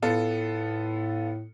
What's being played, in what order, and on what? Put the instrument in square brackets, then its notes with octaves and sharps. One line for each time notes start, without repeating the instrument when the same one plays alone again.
[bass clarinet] A2 [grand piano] B3 F4 A4